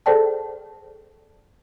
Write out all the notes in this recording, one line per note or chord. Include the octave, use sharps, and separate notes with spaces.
G#4 A4 C5 D5 G5 A5